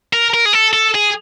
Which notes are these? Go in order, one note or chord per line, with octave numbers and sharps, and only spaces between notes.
A#4
A#4
G#4
A4
A4
G#4